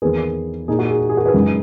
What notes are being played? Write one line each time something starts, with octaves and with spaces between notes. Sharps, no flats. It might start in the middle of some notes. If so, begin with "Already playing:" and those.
E2 D#3 A#3 G#4 B4
A#2 A#3 D#4 G#4
F#4
G#4
G#4
F#4 A#4
G#4 B4
F#2 C#3 G#3 D#4